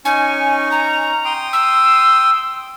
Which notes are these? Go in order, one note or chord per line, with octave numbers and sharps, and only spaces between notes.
C#4 D#4 G#5 C#6
A#5
G5 C6 D#6
E6